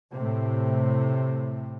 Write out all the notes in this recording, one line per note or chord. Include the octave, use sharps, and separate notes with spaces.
A2 C3